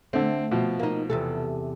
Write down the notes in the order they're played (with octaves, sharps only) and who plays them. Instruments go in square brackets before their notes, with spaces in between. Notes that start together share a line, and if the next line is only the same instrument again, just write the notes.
[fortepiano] D3 C4 [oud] A3
[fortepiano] B2 F3
[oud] A#3 D#4
E2 C3 A4